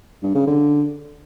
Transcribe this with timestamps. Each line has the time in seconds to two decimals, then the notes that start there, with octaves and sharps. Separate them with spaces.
0.23 G2
0.35 C#3
0.47 D3